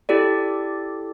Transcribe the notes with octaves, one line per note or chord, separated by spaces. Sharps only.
E4 G4 A4 D5